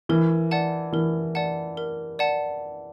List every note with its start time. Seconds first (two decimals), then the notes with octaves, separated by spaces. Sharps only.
0.09 E3 A#4
0.51 D5 F#5 A5
0.92 E3 A#4
1.35 D5 F#5 A5
1.77 A#4
2.19 D5 F#5 A5